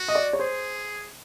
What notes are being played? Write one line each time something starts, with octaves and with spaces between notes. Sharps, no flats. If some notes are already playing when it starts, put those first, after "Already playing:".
Already playing: F#4
D#5
D5
C#5
G#4 C5